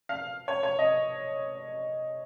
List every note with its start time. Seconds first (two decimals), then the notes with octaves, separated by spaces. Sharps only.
0.09 F5
0.48 C#5
0.63 C#5
0.79 D#5